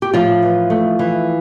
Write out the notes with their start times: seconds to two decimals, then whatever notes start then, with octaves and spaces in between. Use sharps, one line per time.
0.02 G4
0.14 A2 F3 F4
0.42 E3
0.70 A3
0.99 E3